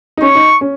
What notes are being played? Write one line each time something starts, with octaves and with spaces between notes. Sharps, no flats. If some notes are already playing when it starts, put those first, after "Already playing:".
D#4
C#4 C#6
D#4
C#4